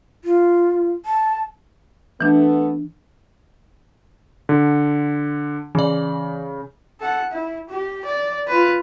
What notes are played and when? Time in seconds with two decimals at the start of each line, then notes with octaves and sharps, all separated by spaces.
0.25 F4
1.06 A5
2.21 E3 A3 B3 D4
4.49 D3
5.75 C#3 E3 D5
7.00 A4 F#5
7.32 E4
7.70 G4
8.05 D5
8.48 F4 B4